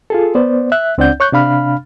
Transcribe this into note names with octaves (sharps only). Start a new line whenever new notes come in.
F4 G#4 A4
B3 C5 D5
E5 F#6
C#2 C4 D4 D5 F#5 G6
C#5 C#6 F#6 G6
C3 D4 F5 B5 F6